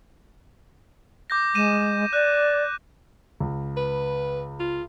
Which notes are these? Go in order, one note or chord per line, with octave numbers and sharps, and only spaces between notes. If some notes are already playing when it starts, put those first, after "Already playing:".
D6 G6 A#6
G#3 D#7 E7
D5 F#6
C#2
B4
F4